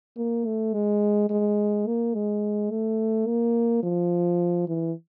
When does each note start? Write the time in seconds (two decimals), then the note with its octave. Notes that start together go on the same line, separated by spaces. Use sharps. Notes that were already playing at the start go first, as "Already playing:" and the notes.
0.17 A#3
0.46 A3
0.74 G#3
1.30 G#3
1.87 A#3
2.14 G#3
2.71 A3
3.27 A#3
3.83 F3
4.68 E3